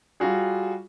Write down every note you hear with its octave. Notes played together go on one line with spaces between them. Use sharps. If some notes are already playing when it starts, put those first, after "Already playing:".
G3 F4 F#4 G#4